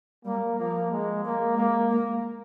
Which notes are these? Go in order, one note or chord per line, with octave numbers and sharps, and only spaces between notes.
G3 A#3
F3 A#3
G#3
G#3 A#3
G#3 A#3
A#3